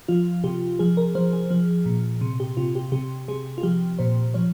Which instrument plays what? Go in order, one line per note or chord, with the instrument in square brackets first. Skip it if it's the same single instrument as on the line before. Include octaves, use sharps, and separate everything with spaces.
[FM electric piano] F3 F4
C3 G4
F3 G#4
A#4
F3 C5
G#4
F3
A#2
C3
G4
C3 F4
G4
C3 G4
C3 G#4
F4
F3 G4
A#2 C5
F3 C#5